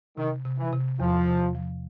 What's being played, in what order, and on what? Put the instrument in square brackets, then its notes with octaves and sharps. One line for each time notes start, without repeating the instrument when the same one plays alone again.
[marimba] C3 [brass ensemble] D#3
[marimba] C3
[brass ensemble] E3
[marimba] C3
[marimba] E2 [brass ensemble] F3
[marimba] C3
F3